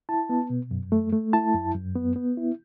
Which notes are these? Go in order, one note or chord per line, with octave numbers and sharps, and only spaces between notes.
E4 A5
B3
B2
F#2
A3
A3
E4 A5
F#2
F#2
B3
B3
E4